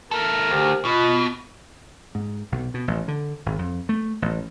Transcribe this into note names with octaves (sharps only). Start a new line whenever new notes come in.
D#3 A4 A#4
D2 G4 C5
B2 F4 D#5 B5
G#2
B1
B2
A1
D3
G#1
F2
A3
A1